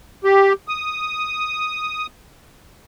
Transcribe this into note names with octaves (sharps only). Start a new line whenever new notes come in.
G4
D#6